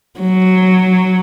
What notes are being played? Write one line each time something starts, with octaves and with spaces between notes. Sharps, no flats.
F#3